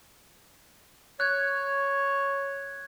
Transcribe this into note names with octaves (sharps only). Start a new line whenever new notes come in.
C#5 F#6 G#6